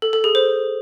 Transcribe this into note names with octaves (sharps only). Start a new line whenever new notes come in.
A4
A4
G#4
C5